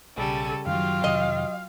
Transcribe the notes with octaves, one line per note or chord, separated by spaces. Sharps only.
B1 C#3 G3 A4 G#5
F#2 D#3 F#3 F4 G4 F5
F2 C3 D#3 D#5